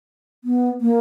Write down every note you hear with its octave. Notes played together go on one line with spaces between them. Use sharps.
B3
A#3